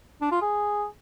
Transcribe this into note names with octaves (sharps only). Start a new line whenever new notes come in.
D4
F4
G#4